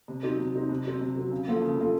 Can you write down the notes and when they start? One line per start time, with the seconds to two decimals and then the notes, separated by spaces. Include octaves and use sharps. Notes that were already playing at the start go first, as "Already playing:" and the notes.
0.08 C3
0.23 F#3 C4 D#4
0.39 C3
0.54 F#3 C4 D#4
0.69 C3
0.85 F#3 C4
1.01 C3
1.16 F#3 C4
1.31 C#3
1.47 F3 A#3 F4 A4
1.62 C#3
1.78 F3 A#3 F4 A4